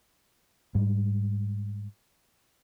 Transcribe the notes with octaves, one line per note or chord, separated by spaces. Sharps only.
G#2 G3